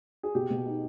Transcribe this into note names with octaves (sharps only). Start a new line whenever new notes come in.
G#4
B2 G4
B2
D#4